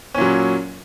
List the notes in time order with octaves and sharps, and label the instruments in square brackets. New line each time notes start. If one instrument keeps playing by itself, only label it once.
[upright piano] C#4
A#2
F#3